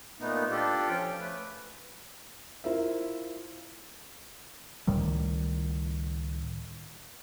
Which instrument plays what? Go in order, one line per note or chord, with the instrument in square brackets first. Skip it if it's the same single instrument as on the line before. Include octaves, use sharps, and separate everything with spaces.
[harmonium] A#2 A3 B3 D#4
D4 F4 G4 A4 D5
F3 C#4 F4 G5
A3 B4
[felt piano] E4 F4 A#4 C5 E5
[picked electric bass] C#2 A2 D#3 G3